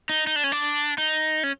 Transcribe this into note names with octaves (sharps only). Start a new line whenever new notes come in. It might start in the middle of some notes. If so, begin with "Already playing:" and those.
D#4
D#4
D4
C#4
D4
D#4
C#4